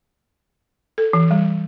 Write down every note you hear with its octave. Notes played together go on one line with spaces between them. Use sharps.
A4
E3
G3